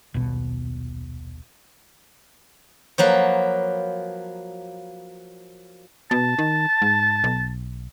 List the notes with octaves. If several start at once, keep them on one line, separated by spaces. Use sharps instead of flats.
D#1 B1 B2
F3 F#3 A#3 B4
B2 A5
D#3
G#2
B1